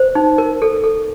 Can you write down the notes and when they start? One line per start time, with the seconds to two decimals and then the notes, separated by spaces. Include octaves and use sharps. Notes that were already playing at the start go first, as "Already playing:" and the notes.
Already playing: C5
0.15 D#4
0.38 A#4
0.62 A4
0.84 A4